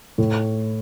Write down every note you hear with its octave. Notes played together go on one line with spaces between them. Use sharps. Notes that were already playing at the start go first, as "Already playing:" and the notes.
A2